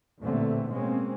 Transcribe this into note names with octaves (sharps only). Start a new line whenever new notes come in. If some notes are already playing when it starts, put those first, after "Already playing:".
A1 E2 A#2 D3 A3 C4
B2 G#3 A#3 C4 C#4